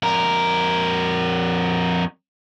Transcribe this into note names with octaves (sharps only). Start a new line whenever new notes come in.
F2 A#4